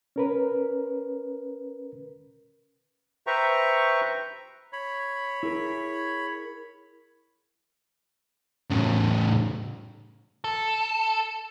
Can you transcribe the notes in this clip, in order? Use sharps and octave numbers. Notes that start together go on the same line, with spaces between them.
C#4 A#4 B4
B4 C5 E5 G5 A#5 C#6
C#5 B5
E4 G#4 A#4
A2 C#3
A4